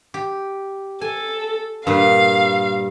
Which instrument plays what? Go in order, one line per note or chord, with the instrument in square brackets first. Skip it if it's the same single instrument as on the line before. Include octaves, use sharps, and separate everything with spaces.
[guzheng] G4
[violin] A4 [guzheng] G#5
[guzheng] G2 A#2 [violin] F5